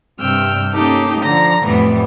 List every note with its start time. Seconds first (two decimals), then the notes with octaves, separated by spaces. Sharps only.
0.20 G2 C3 G5 E6 F6
0.74 A#3 C#4 D#4 G4 A4
1.23 D3 F3 A#5 A#6
1.66 F2 A2 E3 G3 B3 B4